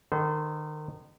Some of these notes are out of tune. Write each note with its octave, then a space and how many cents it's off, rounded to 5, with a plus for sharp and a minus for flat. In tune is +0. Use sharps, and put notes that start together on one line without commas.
D#3 -30 A4 -15 C5 -35